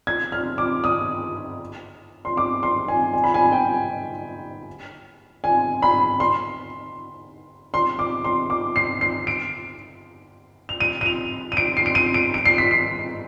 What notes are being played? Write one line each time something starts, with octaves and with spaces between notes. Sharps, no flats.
G#6
F6
D6
D#6
C6
D6
C6
G#5
G#5
B5
G#5
G5
G#5
B5
C6
C6
D6
C6
D6
C7
C7
D7
F7
D#7
D#7
F7
D#7
D7
C7
D7
D#7
D7
D7
C7
B6
C7